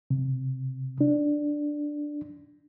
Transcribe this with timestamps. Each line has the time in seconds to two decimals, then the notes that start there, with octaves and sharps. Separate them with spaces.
0.11 C3
1.01 D4